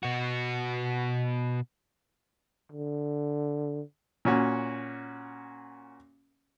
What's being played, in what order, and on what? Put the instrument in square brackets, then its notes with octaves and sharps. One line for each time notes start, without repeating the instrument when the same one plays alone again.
[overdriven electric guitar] B2 F#4
[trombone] D3
[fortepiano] A#2 C#4 F#4